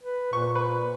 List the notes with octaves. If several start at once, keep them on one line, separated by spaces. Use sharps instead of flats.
B4
A#2 C#6
B4